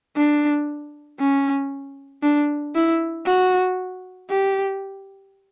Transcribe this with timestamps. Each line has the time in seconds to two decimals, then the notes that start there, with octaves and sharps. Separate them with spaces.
0.17 D4
1.20 C#4
2.23 D4
2.75 E4
3.26 F#4
4.30 G4